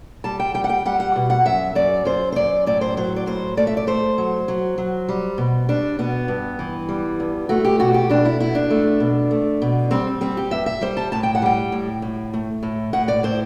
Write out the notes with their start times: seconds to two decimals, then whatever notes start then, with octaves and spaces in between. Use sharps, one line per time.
0.24 G3 A5
0.40 G5
0.54 G3 G5
0.64 F#5
0.69 G5
0.85 G3 F#5
1.00 F#5
1.16 B2
1.30 F#5
1.46 F#2 E5
1.75 F#2 D5
2.05 F#2 C5
2.32 C5
2.36 F#2 D5
2.66 A2 D5
2.81 C5
2.97 F#3 C5
3.16 D5
3.26 A2 C5
3.57 A3 D5
3.67 E5
3.77 D5
3.87 A3 C5
4.18 F#3
4.48 F#3
4.78 F#3
5.09 G3
5.38 B2
5.69 G3 D4
5.99 B2 B3
6.28 G2
6.59 E3
6.89 G3
7.20 G2
7.49 A3 F#4
7.65 G4
7.79 B2 F#4
7.94 G4
8.09 B2 D4
8.25 E4
8.40 B2 E4
8.55 D4
8.70 A3
9.00 B2
9.31 A3
9.62 B2
9.91 G3 C4
10.21 G3 C4
10.37 G4
10.51 G2 E5
10.66 E5
10.81 G3 C5
10.97 A5
11.12 A2 A5
11.23 G5
11.35 F#5
11.42 G3 G5
11.72 A2
12.02 A2
12.34 A3
12.63 A2
12.93 A2 F#5
13.08 D5
13.23 A2 C5